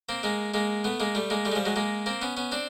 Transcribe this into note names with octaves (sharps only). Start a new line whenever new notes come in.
A#3 C4
G#3 A#3
G#3 A#3
A3 B3
G#3 A#3
G3 A3
G#3 A#3
G3 A3
G#3
F3 G3
F#3 G#3
G#3 A#3
A#3 C4
B3 C#4
B3 C#4
C4 D4